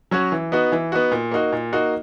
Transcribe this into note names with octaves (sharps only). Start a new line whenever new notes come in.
F#3 C#4 F#4
E3
B3 D#4 F#4
E3
B3 D#4 F#4
A#2
A#3 D#4 F#4
A#2
A#3 D#4 F#4